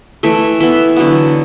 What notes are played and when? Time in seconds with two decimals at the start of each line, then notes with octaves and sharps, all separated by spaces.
0.23 E3 A3 E5
0.60 E3 B3 E5
0.96 D3 F#3 B3